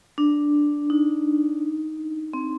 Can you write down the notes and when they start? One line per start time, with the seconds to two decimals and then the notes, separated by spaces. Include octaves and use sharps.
0.18 D4
0.90 D#4
2.33 C4